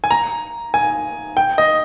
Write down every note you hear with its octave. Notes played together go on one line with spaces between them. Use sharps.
G#5
A#5
G#5
G5
D#5